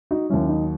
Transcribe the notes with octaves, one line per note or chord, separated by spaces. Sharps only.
D#4 F#4
D#2 D#3 F#3 C#4 E4
D#4